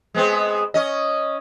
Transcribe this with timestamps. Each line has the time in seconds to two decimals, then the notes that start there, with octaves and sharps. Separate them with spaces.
0.14 G#3 B3 C4
0.74 C#4 D#5